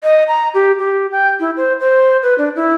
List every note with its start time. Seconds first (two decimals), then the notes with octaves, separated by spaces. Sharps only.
0.03 D#5
0.28 A#5
0.54 G4
0.79 G4
1.12 G5
1.40 E4
1.57 C5
1.80 C5
2.23 B4
2.38 D4
2.56 E4